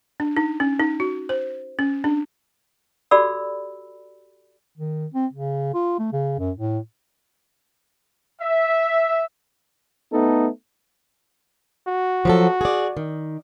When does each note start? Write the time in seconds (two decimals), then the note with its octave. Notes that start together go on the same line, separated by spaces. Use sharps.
0.20 D4
0.37 D#4
0.60 C#4
0.79 D#4
1.00 F#4
1.29 C5
1.79 C#4
2.04 D4
3.11 F#4 G4 A4 D5 B5 E6
4.78 D#3
5.14 C4
5.33 C#3
5.74 F4
5.99 A3
6.13 C#3
6.39 F#2
6.57 A2
8.40 E5
10.12 A3 B3 D#4 A4
11.88 F#4
12.25 F3 F#3 A4
12.61 G#4 D5
12.97 D#3